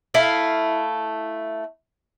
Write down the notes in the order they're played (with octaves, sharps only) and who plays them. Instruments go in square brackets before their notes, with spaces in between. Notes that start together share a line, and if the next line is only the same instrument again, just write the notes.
[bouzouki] A3 E4 F5